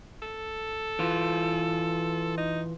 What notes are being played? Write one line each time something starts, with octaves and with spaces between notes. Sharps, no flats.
A4
E3 F4
D#4